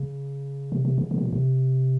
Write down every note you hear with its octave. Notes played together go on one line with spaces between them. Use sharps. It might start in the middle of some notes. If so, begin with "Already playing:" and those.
Already playing: C#3
C3
C3
C#3
C#3
C3
A#2
C3